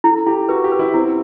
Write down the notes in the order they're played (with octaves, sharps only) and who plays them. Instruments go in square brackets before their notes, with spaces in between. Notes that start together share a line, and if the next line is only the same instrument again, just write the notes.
[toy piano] E4 [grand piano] A4
[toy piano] E4 [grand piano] G4
[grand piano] F#4 [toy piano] B4
[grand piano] G4
[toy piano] B4
[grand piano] E4
[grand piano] C4 [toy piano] E4